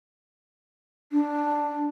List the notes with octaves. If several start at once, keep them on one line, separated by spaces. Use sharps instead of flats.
D4